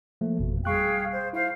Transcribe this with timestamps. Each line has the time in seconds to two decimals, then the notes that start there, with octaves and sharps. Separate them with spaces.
0.21 F3 A3 A#3
0.39 G#1 F2 B2
0.65 G3 G#4 F5 G5 C#6 F#6
1.11 C5
1.33 E4 C5 F5